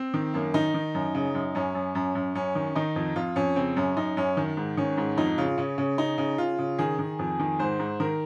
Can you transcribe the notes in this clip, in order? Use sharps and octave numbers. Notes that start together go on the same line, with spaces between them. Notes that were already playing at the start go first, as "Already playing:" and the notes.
Already playing: C4
D#3
F#2 A#3
D#3 D#4
D#3
F#2
C#3
F#2
F#2 C#4
F#2
F#2
F#2
F#2 C#4
D#3
D#3 D#4
F2
F2 F4
F2 C#4
C#3 C4
F#2 C#4
F#2 D#4
F#2 C#4
D#3
G#2
D#3 C#4
G#2
F2 D#4
C#3 F4
C#3 C#4
C#3
C#3 D#4
C#3
C#3 F4
C#3
D#3 G#4
D#3
F2
D#3
G#2 C5
G#2
D#3 A#4